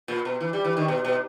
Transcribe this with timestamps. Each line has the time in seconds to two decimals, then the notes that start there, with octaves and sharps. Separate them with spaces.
0.08 A#2
0.25 B2
0.40 E3
0.53 G3
0.64 E3
0.77 D#3
0.88 B2
1.05 B2